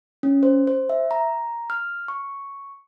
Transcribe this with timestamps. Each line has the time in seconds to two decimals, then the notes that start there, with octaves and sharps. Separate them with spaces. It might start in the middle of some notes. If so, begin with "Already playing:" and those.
0.23 C#4
0.43 C5
0.67 C5
0.89 E5
1.11 A#5
1.70 F6
2.08 C#6